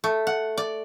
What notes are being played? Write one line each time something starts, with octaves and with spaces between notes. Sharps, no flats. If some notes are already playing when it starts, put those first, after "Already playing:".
A3
F#5
D5